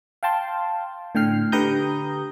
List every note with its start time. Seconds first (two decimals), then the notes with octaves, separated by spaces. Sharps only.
0.23 F5 G5 A5 C6
1.15 A2 D3 G5 F6 C7
1.52 D3 G4 B4 A#5 D#6 G6